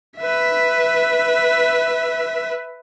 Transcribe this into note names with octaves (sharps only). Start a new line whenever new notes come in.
B4 E5